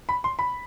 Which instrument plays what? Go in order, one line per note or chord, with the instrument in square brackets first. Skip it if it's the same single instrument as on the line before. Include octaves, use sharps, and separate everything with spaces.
[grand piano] B5
C6
B5